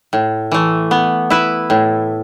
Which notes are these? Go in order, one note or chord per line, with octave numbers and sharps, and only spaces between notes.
A2
E3 A3
B3
E4 B4 E5
A2